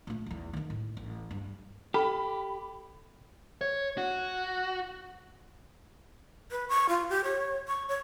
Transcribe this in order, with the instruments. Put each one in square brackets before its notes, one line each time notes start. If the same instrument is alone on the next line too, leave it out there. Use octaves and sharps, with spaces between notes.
[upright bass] A#2 A3
B1 E2
D#3 D#4
A2
A1
G2
[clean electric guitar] G4 [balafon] A4 G5 [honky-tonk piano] B5
[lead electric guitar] C#5
F#4
[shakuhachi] B4
C#6
F4
G4
C#5
C#6
C#5